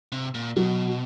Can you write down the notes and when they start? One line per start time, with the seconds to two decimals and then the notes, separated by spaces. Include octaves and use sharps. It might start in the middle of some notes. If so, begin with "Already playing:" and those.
0.12 C3
0.35 A#2
0.56 B2 F#3